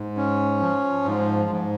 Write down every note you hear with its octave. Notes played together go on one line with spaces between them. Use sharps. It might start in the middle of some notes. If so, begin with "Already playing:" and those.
Already playing: G#2
C#4
F3
G#2
G#2